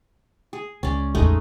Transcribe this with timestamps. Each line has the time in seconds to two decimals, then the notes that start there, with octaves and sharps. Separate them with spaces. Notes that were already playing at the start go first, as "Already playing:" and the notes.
0.53 G#4
0.83 C#2 C#4 D5
1.15 A1 E2 G#3 A3 D#4